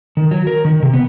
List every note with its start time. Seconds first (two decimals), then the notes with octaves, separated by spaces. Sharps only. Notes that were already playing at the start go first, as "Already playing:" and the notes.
0.17 D#3
0.31 F#3
0.47 A#4
0.65 D#3
0.82 C3
0.93 B3